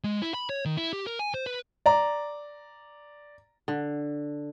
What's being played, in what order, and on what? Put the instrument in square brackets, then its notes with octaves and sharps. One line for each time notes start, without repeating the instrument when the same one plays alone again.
[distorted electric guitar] G#3
E4
B5
C#5
D#3
E4
G4
A#4
G#5
C5
B4
[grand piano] D5 A#5
[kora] D3